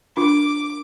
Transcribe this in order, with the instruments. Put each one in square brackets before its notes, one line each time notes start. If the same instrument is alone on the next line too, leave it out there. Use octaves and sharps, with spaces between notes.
[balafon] D4 F4 [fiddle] D6